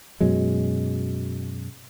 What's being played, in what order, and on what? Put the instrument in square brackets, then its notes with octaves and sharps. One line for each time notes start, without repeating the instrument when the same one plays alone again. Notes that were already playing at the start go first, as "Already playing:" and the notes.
[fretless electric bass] F#2 B2 F#3 G#3